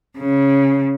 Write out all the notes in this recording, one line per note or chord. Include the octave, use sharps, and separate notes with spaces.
C#3